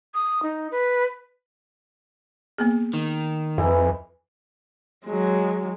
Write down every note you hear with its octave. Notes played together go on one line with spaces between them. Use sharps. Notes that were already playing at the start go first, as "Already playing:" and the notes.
D#6
D#4
B4
A#3 B3 G#4
D#3
F2 E3 D#4 E4
F#3 G#3